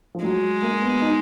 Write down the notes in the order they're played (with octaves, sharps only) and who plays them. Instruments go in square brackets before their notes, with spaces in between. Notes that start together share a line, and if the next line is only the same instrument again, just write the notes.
[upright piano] F3
[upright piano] F#3 [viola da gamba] G#3
[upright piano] A#3
B3
D#4